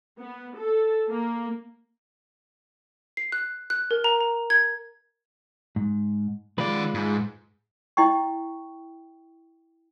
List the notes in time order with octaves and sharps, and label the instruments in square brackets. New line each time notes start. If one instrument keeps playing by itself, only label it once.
[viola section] B3
A4
A#3
[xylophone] C7
F#6
F#6
A#4
A#5
A#5
G#6
[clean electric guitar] G#2
[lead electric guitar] D#3 D5 [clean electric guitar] G#3 F4 B4
[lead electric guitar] G#2
[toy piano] E4 D#5 G5 C#6